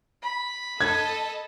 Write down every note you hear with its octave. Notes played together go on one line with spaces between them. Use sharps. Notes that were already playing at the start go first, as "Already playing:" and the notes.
B5
A4 D#5 A5 G#6